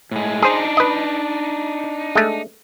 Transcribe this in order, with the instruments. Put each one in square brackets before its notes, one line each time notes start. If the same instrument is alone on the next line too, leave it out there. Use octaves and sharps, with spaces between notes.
[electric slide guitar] A2 G#3
[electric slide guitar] D4 D#4 [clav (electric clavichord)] G#4 C5
[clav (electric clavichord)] B4 D#5
G#3 A3